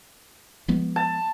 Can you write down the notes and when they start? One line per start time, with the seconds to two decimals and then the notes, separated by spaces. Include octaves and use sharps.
0.68 F3 G#3 B3
0.96 A5